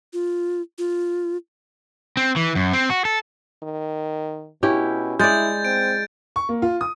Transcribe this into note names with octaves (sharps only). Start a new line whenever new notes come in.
F4
F4
C4
E3
F#2
C4
F#4
A4
D#3
B2 C#4 E4 G4
G#3 E4 D5 G6 A6
C4 D7
C#6
A#3
F4
D#6